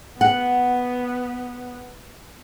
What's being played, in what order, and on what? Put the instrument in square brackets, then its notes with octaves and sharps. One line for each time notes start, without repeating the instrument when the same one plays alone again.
[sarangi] B3 [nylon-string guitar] F#5